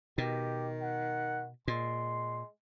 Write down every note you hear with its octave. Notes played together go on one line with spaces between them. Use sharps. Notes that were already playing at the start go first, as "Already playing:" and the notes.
B2 D#3 G4
F#5
A#2 G#3 C6